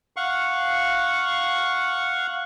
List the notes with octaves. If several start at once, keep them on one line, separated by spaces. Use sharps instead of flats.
F5 F#5 C#6